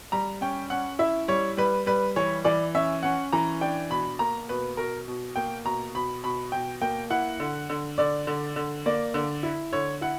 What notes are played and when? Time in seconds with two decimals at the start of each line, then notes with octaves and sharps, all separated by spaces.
0.12 G3 A#5
0.41 C#4 G5
0.70 C#4 F#5
0.99 E4 E5
1.28 G3 C#5
1.57 G3 B4
1.86 G3 B4
2.16 E3 C#5
2.44 E3 D5
2.75 C#4 E5
3.03 C#4 F#5
3.33 E3 A#5
3.61 D4 G5
3.90 B2 B5
4.19 A#3 A#5
4.49 B2 B4
4.77 B2 A#4
5.08 B2
5.36 A#3 G5
5.65 B2 A#5
5.95 B2 B5
6.24 B2 B5
6.52 B2 G5
6.81 A#3 G5
7.10 E4 F#5
7.40 D3
7.70 D3
7.98 D3 D5
8.27 D3
8.56 D3
8.86 A#3 D5
9.14 D3
9.43 E4
9.73 D3 C#5
10.01 E4 F#5